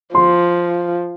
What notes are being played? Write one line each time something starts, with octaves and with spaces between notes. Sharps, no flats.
F3 C6